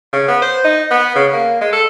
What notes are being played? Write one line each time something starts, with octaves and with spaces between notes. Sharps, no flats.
C#3
B3
C5
D#4
B3
C#3
A#3
G#3
A4